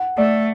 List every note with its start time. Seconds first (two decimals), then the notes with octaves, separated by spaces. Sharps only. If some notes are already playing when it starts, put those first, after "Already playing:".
Already playing: F#5
0.17 A3 D5